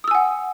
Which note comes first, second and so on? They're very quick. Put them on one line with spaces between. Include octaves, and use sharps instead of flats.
D#6 E6 G#5 F#5